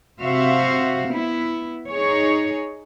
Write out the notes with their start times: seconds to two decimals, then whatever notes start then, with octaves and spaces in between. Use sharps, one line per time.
0.21 C3 F#4 C5 E5 F5
1.10 B3 E4
1.90 D#4 G#4 C#5